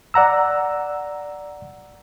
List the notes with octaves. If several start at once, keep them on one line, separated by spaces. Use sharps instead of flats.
D5 F#5 A#5 E6